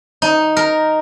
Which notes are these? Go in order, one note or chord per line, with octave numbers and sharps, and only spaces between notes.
D#4
A#4